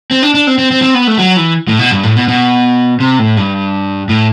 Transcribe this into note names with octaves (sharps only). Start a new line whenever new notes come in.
C4
D4
D4
C4
C4
C4
C4
B3
A3
F#3
E3
A2
B2
G2
A2
B2
B2
C3
A2
G2
A2